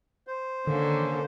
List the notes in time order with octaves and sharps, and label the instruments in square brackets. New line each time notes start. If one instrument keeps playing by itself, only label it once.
[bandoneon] C5
[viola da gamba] D3 [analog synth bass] D#3 [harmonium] A#3 C#4